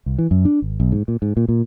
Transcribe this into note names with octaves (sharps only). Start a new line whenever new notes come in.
C2
E3
F#2
D4
G#1
B1
G#2
A#2
G#2
A#2
A#2